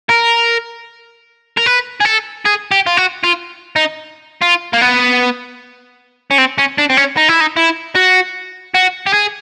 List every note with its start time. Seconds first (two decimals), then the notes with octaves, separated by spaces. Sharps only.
0.09 A#4
1.57 A#4
1.66 B4
2.01 G#4
2.05 A4
2.45 G#4
2.71 G4
2.87 F4
2.97 F#4
3.24 F4
3.76 D#4
4.42 F4
4.73 A#3
4.81 B3
6.31 C#4
6.38 C4
6.58 C#4
6.78 D4
6.90 C4
6.97 C#4
7.17 D#4
7.29 E4
7.41 D#4
7.57 E4
7.95 F#4
8.75 F#4
9.06 G4
9.13 G#4